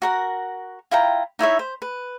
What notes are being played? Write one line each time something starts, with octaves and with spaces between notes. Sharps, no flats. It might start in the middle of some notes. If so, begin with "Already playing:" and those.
F#4 A#4 F#5
E4 F4 G5 A#5
D#4 E4 C#5 E5
C5
B4